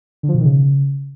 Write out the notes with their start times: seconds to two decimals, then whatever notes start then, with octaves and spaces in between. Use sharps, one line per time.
0.23 D3
0.29 F3
0.34 B2
0.39 D#3
0.45 C#3